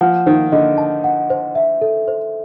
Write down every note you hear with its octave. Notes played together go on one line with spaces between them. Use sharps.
F3 F#5
D#3 C5
D3 D#5
A5
F#5
C5
E5
A4
C5